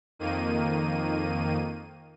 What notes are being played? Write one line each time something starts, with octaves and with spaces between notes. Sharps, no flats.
F2 D#3 A#3 D#7